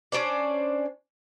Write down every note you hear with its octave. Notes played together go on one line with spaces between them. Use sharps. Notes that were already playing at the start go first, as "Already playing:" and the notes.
C#4 D4 C5 D5